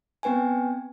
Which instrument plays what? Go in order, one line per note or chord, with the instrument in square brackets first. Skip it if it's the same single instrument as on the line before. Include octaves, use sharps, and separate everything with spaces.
[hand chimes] B3 C4 B4 G5 G#5